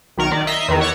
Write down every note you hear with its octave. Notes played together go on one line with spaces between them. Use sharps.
B1 D#3 A#4 C#6
D#3 D5
D#5 E5 A#5 C7
E2 D#3
C#5 F#5 D6 E6 A6